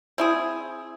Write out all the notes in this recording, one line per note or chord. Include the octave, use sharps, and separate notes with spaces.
C4 E4 G#4